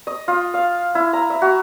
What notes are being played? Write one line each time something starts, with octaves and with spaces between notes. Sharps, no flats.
D#5
F4
F5
E4
A#5
E5
F#4